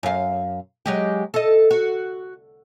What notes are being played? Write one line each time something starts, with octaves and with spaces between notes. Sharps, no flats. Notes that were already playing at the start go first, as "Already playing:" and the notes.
F#2 F5
F#3 G#3 G4
A4 D#5
F#4